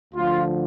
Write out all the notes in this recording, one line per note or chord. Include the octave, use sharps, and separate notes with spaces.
D2 D3 F3 F4